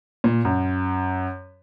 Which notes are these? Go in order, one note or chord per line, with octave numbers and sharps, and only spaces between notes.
A#2
F#2